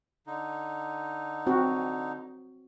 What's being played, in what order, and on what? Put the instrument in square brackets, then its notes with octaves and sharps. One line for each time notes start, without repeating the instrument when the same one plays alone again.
[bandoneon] D3 D#4
[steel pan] C4 F#4